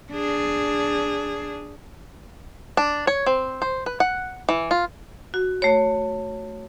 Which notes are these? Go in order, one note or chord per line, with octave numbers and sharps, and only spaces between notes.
D4 G#4
D4
C#5
C4
C5
B4
F#5
E3
F4
F#4
A3 C#5